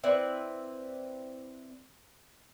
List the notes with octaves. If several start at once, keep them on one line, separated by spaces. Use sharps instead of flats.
C4 E4 B4 D5